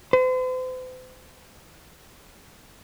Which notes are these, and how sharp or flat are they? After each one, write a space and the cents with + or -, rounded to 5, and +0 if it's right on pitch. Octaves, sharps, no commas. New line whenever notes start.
C5 -40